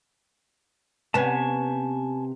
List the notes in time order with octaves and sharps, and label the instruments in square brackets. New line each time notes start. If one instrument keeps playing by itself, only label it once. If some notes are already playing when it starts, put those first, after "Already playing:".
[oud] C3 B3 C#4 [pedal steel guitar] G#5 A5